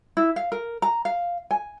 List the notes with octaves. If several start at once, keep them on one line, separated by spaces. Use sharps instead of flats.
E4
F5
A#4
A#5
F5
G#5